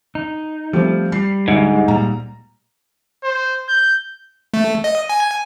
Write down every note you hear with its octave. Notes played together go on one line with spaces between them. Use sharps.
D#4
F3 G3 A3 C4
G3 C7
D2 G#2
A#2 G3 A#5
C5
G6
A3
D#5
G#5